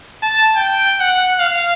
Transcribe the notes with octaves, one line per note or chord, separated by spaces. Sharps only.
A5
G5
F#5
F5